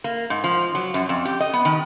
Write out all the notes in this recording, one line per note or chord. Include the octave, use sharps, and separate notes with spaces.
A#3
G#2
F3
F#3
F#2
F2
G4
D#5
B3
D#3